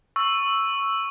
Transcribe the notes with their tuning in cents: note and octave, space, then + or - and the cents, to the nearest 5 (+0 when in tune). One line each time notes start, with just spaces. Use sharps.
C#6 +0 E6 +0